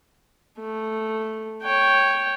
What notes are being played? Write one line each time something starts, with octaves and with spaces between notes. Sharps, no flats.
A3
C#5 G5